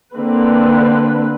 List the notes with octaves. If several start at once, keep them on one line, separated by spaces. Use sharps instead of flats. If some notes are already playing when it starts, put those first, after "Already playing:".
D3 A#3 C4 B4